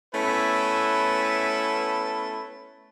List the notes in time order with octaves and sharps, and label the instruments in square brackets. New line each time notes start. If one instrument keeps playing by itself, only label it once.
[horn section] A3 B3 C#4 E4 B4